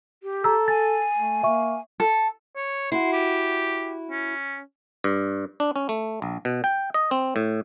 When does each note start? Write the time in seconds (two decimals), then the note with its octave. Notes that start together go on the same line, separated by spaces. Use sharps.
0.23 G4
0.44 A4 A#5 E6
0.68 G#5 A6
1.16 A3
1.43 A#3 E5 C#6
2.00 A4
2.56 C#5
2.92 E4 F#4 C6
3.13 G4
4.11 C#4
5.04 G2
5.60 D4
5.76 C#4
5.89 A3
6.22 A#1
6.45 B2
6.64 G5
6.94 D#5
7.11 C4
7.36 A2